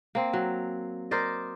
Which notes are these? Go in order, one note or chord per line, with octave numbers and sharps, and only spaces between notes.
A#3 C4
F#3
A#4 C5 D5 D#5